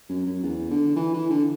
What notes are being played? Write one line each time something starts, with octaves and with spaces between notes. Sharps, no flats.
F#2
F#2
E2
D3
E3
E3
D3